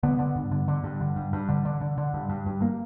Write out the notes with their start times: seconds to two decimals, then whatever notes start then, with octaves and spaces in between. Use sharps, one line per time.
0.03 D3 B3
0.19 D3
0.35 G2
0.51 D3
0.68 D3
0.84 G2
1.01 D3
1.16 G2
1.33 G2
1.49 D3
1.65 D3
1.81 D3
1.98 D3
2.14 G2
2.29 G2
2.46 G2
2.62 A#3